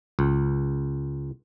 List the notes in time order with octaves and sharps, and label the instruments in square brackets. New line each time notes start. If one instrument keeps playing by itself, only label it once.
[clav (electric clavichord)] C#2